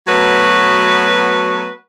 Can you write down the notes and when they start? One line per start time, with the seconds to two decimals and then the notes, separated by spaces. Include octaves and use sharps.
0.07 F#3 A3 B3 F#4 B4 C#5